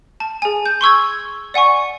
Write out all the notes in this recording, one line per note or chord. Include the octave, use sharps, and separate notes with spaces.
A5
G#4 G#5
G6
C6 C#6 E6 G#6
D5 F#5 G#5 C#6